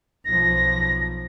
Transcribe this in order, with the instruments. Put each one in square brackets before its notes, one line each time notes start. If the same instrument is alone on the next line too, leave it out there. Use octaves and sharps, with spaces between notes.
[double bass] B1 F3 [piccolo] A#6